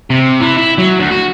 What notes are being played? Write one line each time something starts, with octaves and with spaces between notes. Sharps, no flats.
C3
E3
E4
F#3
D2
F#4